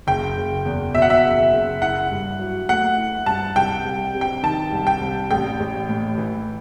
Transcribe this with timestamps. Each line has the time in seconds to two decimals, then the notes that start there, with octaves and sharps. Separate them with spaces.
0.07 F#1 G5
0.37 F#1
0.65 E2
0.94 B2 E5
1.02 F#5
1.10 E5
1.24 F#1
1.53 F#1
1.82 E4 F#5
2.11 G2
2.39 F#3
2.69 A3 F#5
2.98 E4
3.26 G2 A5
3.56 C2 G5
3.85 C2
4.14 C3
4.21 G5
4.43 D#3 A5
4.72 C2
4.87 G5
5.01 C2
5.31 A1 G5
5.60 A1
5.89 A2
6.18 E3